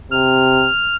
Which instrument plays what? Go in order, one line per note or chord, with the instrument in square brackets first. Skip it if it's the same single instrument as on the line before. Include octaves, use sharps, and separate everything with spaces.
[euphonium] C3 [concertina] F6